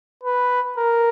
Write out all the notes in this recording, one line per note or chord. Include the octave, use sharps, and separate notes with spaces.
B4
A#4